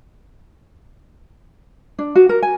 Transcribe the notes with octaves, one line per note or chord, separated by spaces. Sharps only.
D4
F#4
A#4
G#5